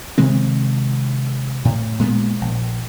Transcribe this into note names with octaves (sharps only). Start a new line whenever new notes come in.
C3 D#3 G#3 C4
A2
A#2 G#3 A3 B3
A#1